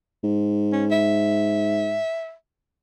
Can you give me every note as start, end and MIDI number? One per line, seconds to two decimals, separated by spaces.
0.24 1.99 44
0.72 0.86 61
0.91 2.33 76